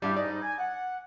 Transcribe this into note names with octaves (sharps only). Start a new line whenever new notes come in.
G2 G3 E4 G4
G#2 G3 D#4 D5
G#5
F#5